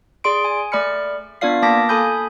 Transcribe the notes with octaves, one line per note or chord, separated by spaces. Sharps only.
G#4 D5 C6 D7
G#5
A3 D5 B5 F6 C#7
B3 D4 F4 D5 F5 C7
A#3 F5 A5 D6 A#6 B6
A4 G#5 B5 D#6 G6